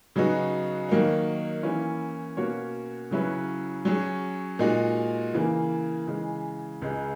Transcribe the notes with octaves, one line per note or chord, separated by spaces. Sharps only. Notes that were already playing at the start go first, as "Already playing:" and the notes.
C#3 F#3 B3 D#4 F#4
D#3 F#3 A#3 D#4
E3 A#3 C#4 E4
B2 A#3 C#4 F#4 C#5
C#3 F#3 C#4 E4 B4
F#3 C#4 G#4
A#2 G#3 D#4 F#4
C#3 E3 A#3
C#3 E3 G#3
C#2 C#3 G#3